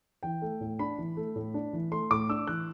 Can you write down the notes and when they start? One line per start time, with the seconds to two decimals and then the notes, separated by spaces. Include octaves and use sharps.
0.23 E3 G5
0.42 A3
0.61 A2
0.79 D4 B5
0.99 E3
1.17 A3
1.36 A2
1.54 D4
1.73 E3
1.92 A3 C6
2.11 A2 D6
2.29 D4 E6
2.47 E3 F#6